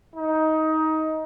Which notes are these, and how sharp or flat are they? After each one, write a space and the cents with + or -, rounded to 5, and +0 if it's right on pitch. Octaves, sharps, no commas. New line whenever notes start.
D#4 +15